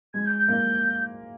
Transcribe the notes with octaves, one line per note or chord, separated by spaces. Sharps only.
G#3 G#6
G6
G6
A#3